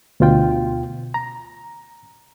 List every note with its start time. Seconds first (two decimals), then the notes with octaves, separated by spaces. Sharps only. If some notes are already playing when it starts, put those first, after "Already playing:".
0.20 D2 B2 F4 G5
1.14 A#5